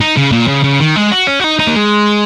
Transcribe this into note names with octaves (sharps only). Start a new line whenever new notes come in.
D#4
C#3
A#2
C#3
C#3
D#3
G#3
F#4
C#4
F#4
D#4
D#4
A#3
G#3